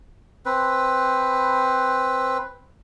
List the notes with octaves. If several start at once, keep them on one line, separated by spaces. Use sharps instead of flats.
C4 B4